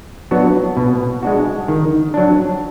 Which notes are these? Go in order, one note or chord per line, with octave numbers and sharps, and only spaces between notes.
F#3 B3 D4 F#4
B2
G#3 D4 F#4
D#3
F#3 D4